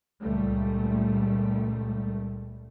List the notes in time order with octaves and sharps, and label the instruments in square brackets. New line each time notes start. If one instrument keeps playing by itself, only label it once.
[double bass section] C#2 A#2 G3 A3